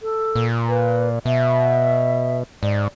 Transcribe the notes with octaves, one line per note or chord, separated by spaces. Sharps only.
A4
A#2
B4
B2 E5
G#2 D5